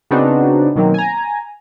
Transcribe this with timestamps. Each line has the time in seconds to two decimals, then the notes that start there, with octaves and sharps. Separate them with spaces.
0.11 C#3 B3 C4 D4 D#4 F#4
0.76 B2 D#3 F#3 A#3 C4
0.94 G#5 A#5